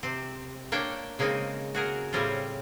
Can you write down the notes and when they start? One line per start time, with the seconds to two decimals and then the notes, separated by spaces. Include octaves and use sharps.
0.03 C3 C4
0.72 A#3 D4 C#5 D5 G5
1.19 C#3 G#3 A#3 C4 D#4
1.75 F#4 G#4 A#4
2.13 A2 C#3 G3 C4 C#4 F4